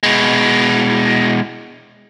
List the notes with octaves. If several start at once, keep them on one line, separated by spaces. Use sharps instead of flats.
B2 G#3